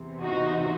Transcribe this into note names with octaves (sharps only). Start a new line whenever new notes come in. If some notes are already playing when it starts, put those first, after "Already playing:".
Already playing: E2 C3 E3
D#4 F#4